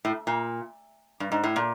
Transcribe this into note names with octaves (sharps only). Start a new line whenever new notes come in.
A2
A#2
G2
G#2
A2
A#2